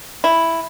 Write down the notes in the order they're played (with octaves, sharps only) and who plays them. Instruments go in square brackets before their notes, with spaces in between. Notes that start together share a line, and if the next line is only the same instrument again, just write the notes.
[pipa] E4